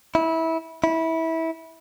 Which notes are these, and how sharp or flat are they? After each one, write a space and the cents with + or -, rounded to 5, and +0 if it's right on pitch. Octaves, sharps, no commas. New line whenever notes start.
E4 -20
E4 -20